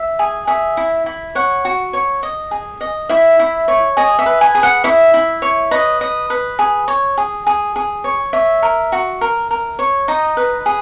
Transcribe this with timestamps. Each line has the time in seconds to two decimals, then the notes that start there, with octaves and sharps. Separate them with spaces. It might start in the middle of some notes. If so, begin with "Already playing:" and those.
Already playing: E5
0.19 G#4
0.47 G#4 E5
0.77 E4
1.06 E4
1.35 C#5 F#5
1.65 F#4
1.93 C#5
2.23 D#5
2.51 G#4
2.81 D#5
3.09 E4 E5
3.39 E4
3.68 C#5
3.97 G#4 D#5
4.19 E5
4.26 B4
4.41 G#5
4.55 G#4
4.63 F#5
4.84 E4 E5
5.14 E4
5.42 C#5
5.71 B4 D#5
6.01 D#5
6.30 B4
6.59 G#4
6.88 C#5
7.18 G#4
7.47 G#4
7.76 G#4
8.04 C#5
8.33 C#5 E5
8.63 A#4
8.92 F#4
9.21 A#4
9.51 A#4
9.79 C#5
10.08 D#4 D#5
10.37 B4
10.66 G#4